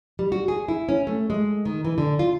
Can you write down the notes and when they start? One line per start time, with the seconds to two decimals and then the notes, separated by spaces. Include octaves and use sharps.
0.19 G3
0.32 F#4
0.48 G#4
0.68 E4
0.89 C#4
1.07 A3
1.30 G#3
1.65 D#3
1.85 E3
1.98 D3
2.19 F4